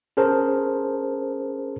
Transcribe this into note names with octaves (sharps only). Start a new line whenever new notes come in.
C#4 G#4 A#4 C5 A5